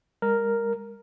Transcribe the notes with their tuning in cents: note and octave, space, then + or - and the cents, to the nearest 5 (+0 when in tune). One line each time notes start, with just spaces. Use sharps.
G#3 -45 A#4 +0